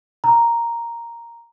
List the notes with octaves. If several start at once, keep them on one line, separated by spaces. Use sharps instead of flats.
A#5